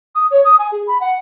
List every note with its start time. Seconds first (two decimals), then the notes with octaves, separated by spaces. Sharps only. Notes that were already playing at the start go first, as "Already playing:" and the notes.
0.15 D#6
0.31 C#5
0.45 D#6
0.59 G#5
0.72 G#4
0.87 B5
1.01 F#5